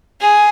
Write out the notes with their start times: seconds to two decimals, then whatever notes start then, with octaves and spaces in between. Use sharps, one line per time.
0.21 G#4